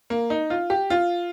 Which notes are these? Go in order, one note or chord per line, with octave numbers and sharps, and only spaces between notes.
A#3
D#4
F4
G4
F4